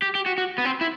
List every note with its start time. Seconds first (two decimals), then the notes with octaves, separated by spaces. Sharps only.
0.02 G4
0.15 G4
0.26 F#4
0.38 F#4
0.58 B3
0.65 C4
0.81 E4